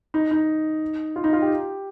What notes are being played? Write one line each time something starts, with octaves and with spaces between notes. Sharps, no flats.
D#4
D#4
F4
D#4
F4
G4